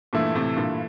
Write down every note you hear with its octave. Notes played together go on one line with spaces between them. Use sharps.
G2 A#2 E3 A3 E4
A2 C3
G2 A#2